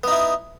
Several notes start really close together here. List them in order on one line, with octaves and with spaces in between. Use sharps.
B3 D#4 E4